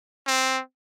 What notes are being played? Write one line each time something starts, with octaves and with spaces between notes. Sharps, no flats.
C4